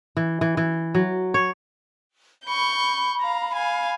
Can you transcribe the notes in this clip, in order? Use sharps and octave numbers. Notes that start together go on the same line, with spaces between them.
E3
E3
E3
F#3
C#5
B5 C#6 G6
F5 A#5
F5 G#5